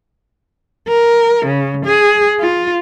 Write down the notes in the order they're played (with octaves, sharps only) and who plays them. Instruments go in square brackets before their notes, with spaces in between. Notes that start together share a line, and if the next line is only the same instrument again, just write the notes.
[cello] A#4
C#3
G#4
F4